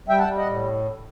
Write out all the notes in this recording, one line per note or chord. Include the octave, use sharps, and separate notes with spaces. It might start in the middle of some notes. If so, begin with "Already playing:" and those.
G3 E5 G5
F#5 A5
G3
D#5 F#5
A2